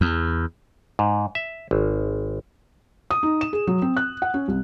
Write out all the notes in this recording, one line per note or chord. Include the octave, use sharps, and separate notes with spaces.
E2
G#2
E5
G#1
D#6
D#4
E7
G#4
F#3
C4
F#6
F#5
C#4
C2